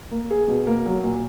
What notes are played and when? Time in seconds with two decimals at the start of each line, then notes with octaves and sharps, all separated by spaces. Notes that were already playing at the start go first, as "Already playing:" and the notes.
0.11 A#3
0.31 G#4
0.48 B2
0.67 A#3
0.86 F#3
1.04 A#2